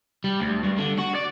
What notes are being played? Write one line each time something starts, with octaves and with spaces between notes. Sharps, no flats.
G3
D2
G2
D3
F#4
D5